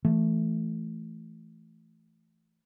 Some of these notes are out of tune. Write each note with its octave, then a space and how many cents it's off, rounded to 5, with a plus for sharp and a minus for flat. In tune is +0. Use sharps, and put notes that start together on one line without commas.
E3 +15 A3 +0